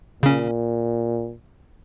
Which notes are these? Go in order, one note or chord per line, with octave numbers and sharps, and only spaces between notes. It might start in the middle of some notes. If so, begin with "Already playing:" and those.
A#2 C#3 C#4